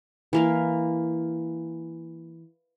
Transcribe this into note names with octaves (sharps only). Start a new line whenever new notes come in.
E3 A#3 F5